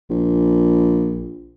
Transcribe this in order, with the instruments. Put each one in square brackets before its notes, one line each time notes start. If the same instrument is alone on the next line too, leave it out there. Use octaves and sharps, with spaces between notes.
[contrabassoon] A#1